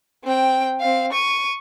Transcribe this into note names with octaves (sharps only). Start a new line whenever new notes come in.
C4 G5
C4 F5
C#6 D#7